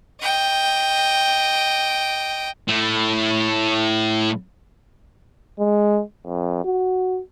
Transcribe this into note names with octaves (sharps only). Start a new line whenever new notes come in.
D#5 G5
A2 A3
G#3
F2
F#4